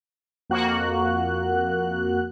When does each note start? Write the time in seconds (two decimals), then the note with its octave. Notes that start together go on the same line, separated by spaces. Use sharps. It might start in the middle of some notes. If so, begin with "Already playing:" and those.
0.50 F2 A#3 F#4 F#6